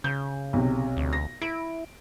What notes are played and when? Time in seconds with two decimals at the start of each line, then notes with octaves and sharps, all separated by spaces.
0.04 C#3 G6
0.53 B1 C3
0.97 D2
1.13 A#6
1.42 E4 D7